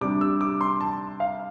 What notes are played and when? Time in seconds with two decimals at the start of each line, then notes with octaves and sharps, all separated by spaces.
0.01 C3 G3 D4 D6
0.21 E6
0.41 D6
0.61 C6
0.81 A5
1.20 F5